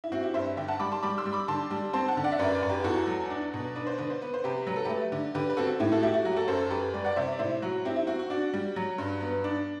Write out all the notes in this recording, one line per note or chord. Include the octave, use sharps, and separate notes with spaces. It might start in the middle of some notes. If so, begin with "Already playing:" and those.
E4
C4 F#4
E4 G4
G2 C5 E5
D3 E5 G5
F#5 A5
G3 B5 D6
A5 C6
G3 B5 D6
C6 E6
G3
B5 D6
D3 A5 C6
G3
C4 A5 C6
F#5 A5
D3
D5 F#5
E5
F#2 B4 D5
B4 D5
F#2
G4 B4
G4
E2 F#4 A4
F#3
D4
B2
D4 B4
C5
D3 B4
C5
B3 B4
C5
C3 G4 B4
F#3 B4
A4
A3 G4 B4
D3
D3 G4 B4
B4
C4 F#4 A4
A2 E4 G4
F#4 A4
A3 E4 G4
F#4
F#3 F#4
G4
F#4 A4
F#2 A4 C5
A4
F#2 G4 B4
G3 B4 D5
D5 F#5
C3 C5 E5
D5
A2 C5 E5
F#3 F#4
C4 E4 G4
E4
C4 F#4
F#4
D4 F#4
G3
F#3
G2
B3
D4